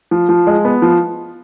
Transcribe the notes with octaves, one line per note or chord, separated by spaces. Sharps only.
F3
F3
G#3
B3
F3